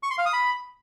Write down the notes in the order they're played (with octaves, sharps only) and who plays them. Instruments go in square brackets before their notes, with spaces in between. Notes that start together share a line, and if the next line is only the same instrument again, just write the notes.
[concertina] C#6
C6
F5
D#6
B5